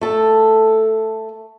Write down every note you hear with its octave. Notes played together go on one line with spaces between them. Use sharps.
A3 A4